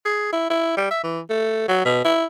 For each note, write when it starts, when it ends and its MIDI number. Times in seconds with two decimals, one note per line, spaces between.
0.05 0.31 68
0.32 0.50 64
0.50 0.73 64
0.77 0.89 55
0.91 0.99 76
1.03 1.20 52
1.30 1.67 57
1.68 1.80 54
1.85 1.99 47
2.04 2.25 64